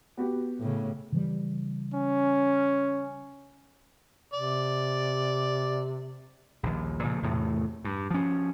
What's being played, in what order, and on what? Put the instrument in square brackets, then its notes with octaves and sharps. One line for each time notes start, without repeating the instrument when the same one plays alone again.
[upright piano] B3 F#4 G4
[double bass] A2 C#3
[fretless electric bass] C#3 E3 G3
[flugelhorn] C#4
[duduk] C3 [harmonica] D5
[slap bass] A#1 D#2
A#2 C#3 F3
E2 A2 C3 A3
G2
F3 C#4